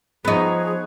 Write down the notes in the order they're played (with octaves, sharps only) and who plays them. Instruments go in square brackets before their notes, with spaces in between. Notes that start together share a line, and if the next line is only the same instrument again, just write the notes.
[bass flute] F3 [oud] B3 D#4 [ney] G#4 [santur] B4 C#5